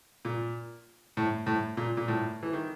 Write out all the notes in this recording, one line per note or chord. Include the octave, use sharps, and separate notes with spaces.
A#2
A2
A2
A#2
A#2
A2
E3
D#3